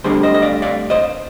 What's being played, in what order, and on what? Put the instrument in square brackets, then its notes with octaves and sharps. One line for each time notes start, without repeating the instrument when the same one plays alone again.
[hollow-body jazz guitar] D2 D3 G3 C4 G#4 C5
C5 D#5
D#5
D5 F5
D5 F5
C5 D#5